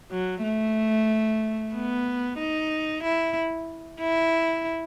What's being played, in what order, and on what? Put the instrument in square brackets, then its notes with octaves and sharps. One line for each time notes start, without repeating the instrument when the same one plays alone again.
[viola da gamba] F#3
A3
B3
D#4
E4
E4